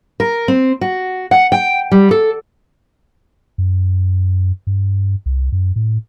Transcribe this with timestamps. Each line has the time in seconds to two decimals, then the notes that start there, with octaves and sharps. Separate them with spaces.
0.20 A#4
0.48 C4
0.81 F#4
1.31 F#5
1.52 G5
1.92 G3
2.11 A4
3.58 F#2
4.67 G2
5.26 C2
5.52 F#2
5.76 A2